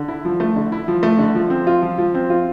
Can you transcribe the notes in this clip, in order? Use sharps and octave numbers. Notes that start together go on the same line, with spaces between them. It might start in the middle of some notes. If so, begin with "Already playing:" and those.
Already playing: D3
E4
F3
A3
D3
E4
F3
A3
D3
F3
C4
F4
F3
F3
C4
F4